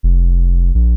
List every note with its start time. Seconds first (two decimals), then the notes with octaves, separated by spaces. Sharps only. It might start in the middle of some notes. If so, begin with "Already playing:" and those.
0.03 F1
0.74 A#1